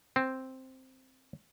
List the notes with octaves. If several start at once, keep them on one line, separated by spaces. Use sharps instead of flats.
C4